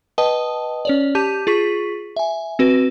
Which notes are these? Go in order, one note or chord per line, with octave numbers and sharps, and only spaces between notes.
B4 D#5 G5 A5 D#6
C#4 C#5 D5
G4 A5 D6 G6 D#7
F4 G#4 C#6 B6
E5 G#5
C4 F#4 B4